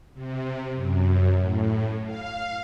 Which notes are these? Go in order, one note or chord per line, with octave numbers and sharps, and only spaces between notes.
C3
F#2
A2
F5